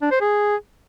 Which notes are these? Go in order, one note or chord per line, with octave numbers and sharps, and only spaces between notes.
D4
C5
G#4